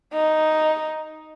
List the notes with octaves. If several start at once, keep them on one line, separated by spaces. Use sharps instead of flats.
D#4